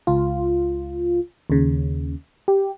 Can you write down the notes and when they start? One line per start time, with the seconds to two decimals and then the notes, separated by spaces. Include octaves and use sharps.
0.07 C#2 F4
1.50 D#2 C#3
2.48 G4